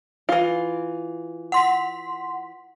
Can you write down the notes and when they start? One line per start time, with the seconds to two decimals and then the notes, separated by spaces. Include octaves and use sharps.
0.29 E3 F4
1.52 F#5 C6 B6